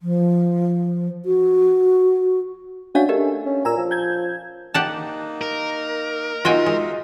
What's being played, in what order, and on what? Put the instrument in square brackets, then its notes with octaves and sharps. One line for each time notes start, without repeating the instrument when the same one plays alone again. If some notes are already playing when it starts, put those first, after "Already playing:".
[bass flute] F3
F#4
[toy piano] C#4 C#5 F5 [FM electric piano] D4 E5 G#5 [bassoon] F#4
[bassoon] A3 [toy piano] G4 A#4 D#5
[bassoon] C#4
[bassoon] A#2 [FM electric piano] G#5 A#5 E6
[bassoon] F3
[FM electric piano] G6 G#6
[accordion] A#3 D#4 [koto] G4 F#5 A5
[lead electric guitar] A#4
[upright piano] D#4 F4 [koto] F#4 G5 G#5 [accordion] E5
[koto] G#3